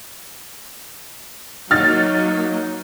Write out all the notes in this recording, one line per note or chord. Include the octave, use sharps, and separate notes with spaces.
F#3 A#3 D#4 F6 A6